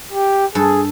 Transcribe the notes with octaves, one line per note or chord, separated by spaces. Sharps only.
G4
G2 G#4 A4